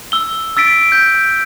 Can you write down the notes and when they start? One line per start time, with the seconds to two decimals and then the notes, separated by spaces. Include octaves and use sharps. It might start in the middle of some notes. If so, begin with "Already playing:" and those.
0.12 E6 G7
0.57 E6 A6 B6 D7
0.92 G6